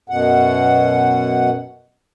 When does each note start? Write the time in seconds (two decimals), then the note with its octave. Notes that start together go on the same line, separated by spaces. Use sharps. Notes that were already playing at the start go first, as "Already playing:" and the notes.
0.09 F#2 B2 F#5